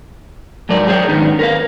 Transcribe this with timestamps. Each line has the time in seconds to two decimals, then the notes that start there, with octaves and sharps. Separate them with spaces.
0.69 G#2 F#3 A#4 D5
0.88 G#4 C5 C#5 E5 G5
1.08 G#2 D3 D#3 B3 C#4 D#4
1.39 A#4 B4 F5